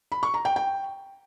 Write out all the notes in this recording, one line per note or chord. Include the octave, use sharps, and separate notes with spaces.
B5
C#6
A#5
G5
G5